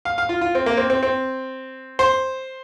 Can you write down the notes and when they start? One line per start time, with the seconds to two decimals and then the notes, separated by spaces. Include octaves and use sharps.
0.05 F5
0.18 F5
0.29 F4
0.41 F4
0.55 C4
0.66 A#3
0.77 C4
0.90 C4
1.03 C4
1.99 C5